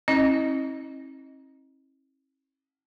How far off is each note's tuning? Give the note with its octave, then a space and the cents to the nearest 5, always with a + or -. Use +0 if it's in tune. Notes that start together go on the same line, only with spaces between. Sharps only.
C#4 -45 E4 -40 D#5 +0